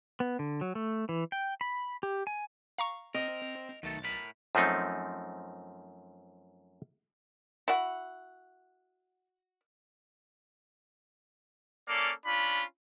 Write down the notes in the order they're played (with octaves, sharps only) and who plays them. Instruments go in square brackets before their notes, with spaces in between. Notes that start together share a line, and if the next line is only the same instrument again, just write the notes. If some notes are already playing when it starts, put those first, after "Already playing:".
[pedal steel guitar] B3
D3
F#3
A3
E3
G5
B5
G4
G#5
[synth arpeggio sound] F5 A#5 C#6
[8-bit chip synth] C4 [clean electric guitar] A#4 [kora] D#5
[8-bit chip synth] B1 A6 [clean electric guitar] D#3 A3 A4
[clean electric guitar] A2 A#4 B5
[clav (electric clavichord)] F#2 F3 A3 C4 D#4
[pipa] E4 F#4 F#5
[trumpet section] A#3 C#4 A4 D5 F5
C#4 D4 F4 B5